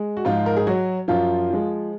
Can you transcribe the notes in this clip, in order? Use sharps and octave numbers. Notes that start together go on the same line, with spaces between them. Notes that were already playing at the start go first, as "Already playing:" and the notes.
Already playing: G#3
F#4
G#2 F3 F4
A#4
G#4
F#3 F#4
F#2 F3 F4
F3 G#3